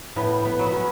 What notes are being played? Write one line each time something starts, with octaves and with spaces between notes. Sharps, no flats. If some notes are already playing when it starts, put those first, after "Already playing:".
A2 B3
B3
F#3
B3
C#4